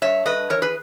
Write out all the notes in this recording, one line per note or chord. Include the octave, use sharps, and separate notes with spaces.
G2 C#5 E5
G2 B4 D#5
E3 A#4 C#5
G#4 B4